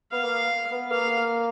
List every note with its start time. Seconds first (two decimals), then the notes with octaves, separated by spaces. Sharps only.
0.12 B3 F5
0.24 A#3
0.72 B3
0.91 A#3 F5